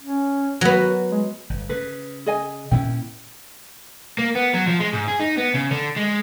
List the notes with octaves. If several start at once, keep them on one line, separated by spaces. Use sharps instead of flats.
C#4
F#3 B3 F#4
G#3
G1
C#3 B4
G#4 D#5 G#5
A#2 C4 C#4 E4 G5
A#3
B3
F#3
F3
G#3
G#2
G#4
D#4
B3
C#3
D3
G#3